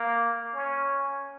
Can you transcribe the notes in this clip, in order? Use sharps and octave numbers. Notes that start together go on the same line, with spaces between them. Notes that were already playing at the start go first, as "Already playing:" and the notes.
Already playing: A#3
C#4